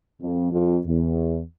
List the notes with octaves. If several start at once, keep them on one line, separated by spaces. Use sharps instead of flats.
F2
F2
E2